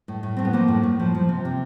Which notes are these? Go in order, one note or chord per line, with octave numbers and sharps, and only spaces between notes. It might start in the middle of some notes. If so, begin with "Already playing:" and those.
A2
A2
A2 C4
B3
F3 A#3
A2
A2
F3
F3
C3
C3